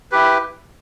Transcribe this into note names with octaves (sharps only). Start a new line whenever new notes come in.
E4 G4 B4